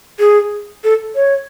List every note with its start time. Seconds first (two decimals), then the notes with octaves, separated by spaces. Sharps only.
0.19 G#4
0.84 A4
1.15 C#5